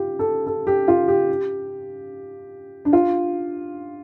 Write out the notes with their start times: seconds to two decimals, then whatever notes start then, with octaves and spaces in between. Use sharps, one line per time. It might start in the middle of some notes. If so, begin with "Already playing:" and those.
Already playing: F4 G4
0.19 A4
0.47 A4
0.67 G4
0.88 F4
1.08 G4
2.85 D4
2.93 F4